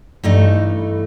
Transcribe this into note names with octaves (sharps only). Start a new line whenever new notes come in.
G2 E3 A3 D#4